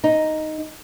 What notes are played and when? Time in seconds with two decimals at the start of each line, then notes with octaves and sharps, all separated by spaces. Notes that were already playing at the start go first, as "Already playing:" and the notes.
0.04 D#4